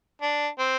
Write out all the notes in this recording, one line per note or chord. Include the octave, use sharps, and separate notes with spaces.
D4
C4